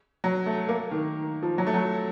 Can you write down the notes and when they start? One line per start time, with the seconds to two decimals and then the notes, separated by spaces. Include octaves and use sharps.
0.24 F#3
0.46 A3
0.69 A#3
0.91 D#3
1.43 F3
1.58 F#3
1.67 A3
1.74 F#3